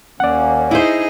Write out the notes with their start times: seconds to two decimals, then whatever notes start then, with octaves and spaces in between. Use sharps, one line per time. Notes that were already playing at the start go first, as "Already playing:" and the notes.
0.20 D#2 A#3 C#4 D5 F#5
0.71 D#4 E4 G#4 C5 D#5